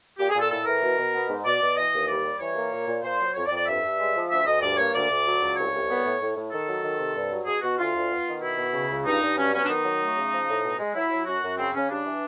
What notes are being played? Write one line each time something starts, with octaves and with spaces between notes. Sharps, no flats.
A#2 G4
G#4
A#2
A4
A2 A4
E3 A#4
B2
B2
B3
G#2
B2 D5
B2
E3 D#5
D#2
G3 D5
G3
E3 C#5
A#3
A#2
A#2
A#2 C5
F#3
F2 C#5
D5
F2
D5
G2 E5
G2
G#3
F3
D2 E5
D2 D#5
G2 D5
A#3 C#5
D2 D5
D2
F#3
C#2
C2 C#5
C2
B3
A2
A2
A2
D#3 A4
F#3
D#3
C3
G2
F#3
B2 G#4
B2 F#4
D2 F4
D2
B3
D#3
B2 E4
B2
C#3
C#2
G2 D#4
G2
F#3 C#4
B3 C#4
D4
D#3 D#4
F#3
A3
C#3
F3
A2
B2
G#3
F#3 E4
F#3
F#2 F#4
F#2
C#3 C4
C#3 C#4
G3 D4
E3